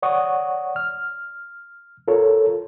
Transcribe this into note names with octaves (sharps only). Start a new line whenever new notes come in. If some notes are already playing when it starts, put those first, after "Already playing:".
C#5 D5 F#5 C#6 D#6
F6
F4 A4 A#4 C#5